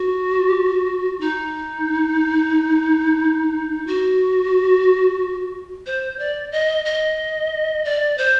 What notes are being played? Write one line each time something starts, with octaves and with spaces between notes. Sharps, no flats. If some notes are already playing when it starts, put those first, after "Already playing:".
Already playing: F#4
D#4
F#4
C5
D5
D#5
D#5
D5
C5